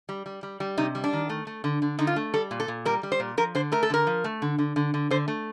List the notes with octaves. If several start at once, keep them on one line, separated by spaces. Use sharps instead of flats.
G3
G3
G3
G3
C3 D#4
G3
D4
D#3
A3
A3
D3
D3
D3 D#4
F4
A3
G3 A4
A#2
A4
A#2
G3 A#4
G3
C5
A#2
F3 A#4
D3 C5
A3 A#4
A4
D3 A#4
F3
A3
D3
D3
D3
D3
D3 C5
A3